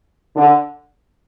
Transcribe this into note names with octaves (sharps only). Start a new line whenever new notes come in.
D3